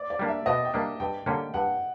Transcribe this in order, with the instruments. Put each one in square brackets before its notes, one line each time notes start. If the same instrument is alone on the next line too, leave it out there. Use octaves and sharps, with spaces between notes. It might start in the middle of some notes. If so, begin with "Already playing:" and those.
Already playing: [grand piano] D5
D5
[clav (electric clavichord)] G3 A#3 D4
[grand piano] E5
[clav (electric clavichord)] B2 [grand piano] D#5
[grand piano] G5
[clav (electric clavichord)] G3 A#3 D4
[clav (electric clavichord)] G2 [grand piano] G5
[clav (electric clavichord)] D3 G3 A#3 C#4
[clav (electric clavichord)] G2 [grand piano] F#5